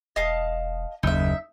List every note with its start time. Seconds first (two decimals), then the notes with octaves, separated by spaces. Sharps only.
0.16 E1 D#5 F5 A5
1.03 F#1 D#2 D#4 E5